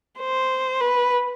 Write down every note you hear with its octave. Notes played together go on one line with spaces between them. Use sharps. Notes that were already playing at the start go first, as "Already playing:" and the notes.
C5
B4